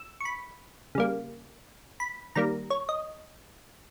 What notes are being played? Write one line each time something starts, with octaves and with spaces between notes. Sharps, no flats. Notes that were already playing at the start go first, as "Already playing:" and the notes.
Already playing: E6
C#6
B5
C#3 G3 A#3
B5
D#3 G3 A#3 A#5
C#5
D#5